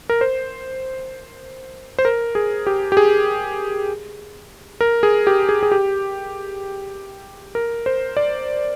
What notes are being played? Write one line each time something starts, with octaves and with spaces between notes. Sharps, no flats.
A#4
C5
C5
A#4
G#4
G4
G4
G#4
A#4
G#4
G4
G#4
G#4
G4
A#4
C5
D5